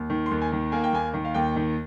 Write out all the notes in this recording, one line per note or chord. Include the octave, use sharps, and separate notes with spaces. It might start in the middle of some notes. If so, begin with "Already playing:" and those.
Already playing: D#2
D#3
C6
D#2
G#5
D#3
A#3 G#5
G5
D#2 G#5
D#3
F5
D#2 G5
D#3